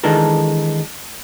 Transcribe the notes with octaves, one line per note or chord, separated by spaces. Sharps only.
D#3 E3 G#3 D4 A4 A#4